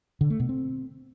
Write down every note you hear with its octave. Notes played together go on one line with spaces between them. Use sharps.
D3
A3
B2
C4